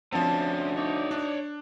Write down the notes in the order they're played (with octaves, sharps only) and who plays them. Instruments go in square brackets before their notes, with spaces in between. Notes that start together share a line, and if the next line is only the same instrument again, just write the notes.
[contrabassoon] D2 [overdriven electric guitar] C3 C#4 [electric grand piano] F3 C4 [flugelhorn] A5
[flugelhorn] D#4 [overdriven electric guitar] C#5 D5
[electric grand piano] D4